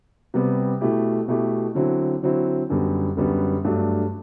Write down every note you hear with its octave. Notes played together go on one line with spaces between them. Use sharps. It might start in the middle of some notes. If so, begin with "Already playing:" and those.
C3 G3 B3
B2 A3 E4 G4
B2 A3 E4 G4
D3 F#3 C4 E4
D3 F#3 C4 E4
F#2 D3 G3 B3
F#2 D3 G3 B3
G2 F#3 A3 D4